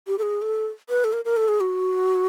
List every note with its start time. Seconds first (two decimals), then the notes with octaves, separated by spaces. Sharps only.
0.08 G4
0.18 A4
0.23 G#4
0.42 A4
0.89 B4
1.04 A4
1.13 A#4
1.25 A#4
1.37 A4
1.48 G#4
1.61 F#4